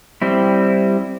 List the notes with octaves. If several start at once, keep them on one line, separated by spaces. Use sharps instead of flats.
G3 C4 E4